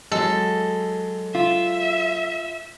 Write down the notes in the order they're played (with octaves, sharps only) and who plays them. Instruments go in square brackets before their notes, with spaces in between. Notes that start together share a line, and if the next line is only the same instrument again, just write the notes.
[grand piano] F#3 G#3 [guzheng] A4
[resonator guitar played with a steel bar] F4 [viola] E5